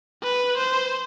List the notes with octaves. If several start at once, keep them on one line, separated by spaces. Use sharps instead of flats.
B4
C5